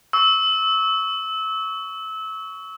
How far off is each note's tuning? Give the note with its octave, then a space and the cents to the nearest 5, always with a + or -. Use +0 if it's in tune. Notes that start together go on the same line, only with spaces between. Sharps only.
C#6 +15 E6 -25